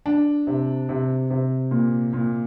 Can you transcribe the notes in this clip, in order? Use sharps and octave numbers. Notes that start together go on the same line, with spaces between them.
D4
C3
C3
C3
A#2
A#2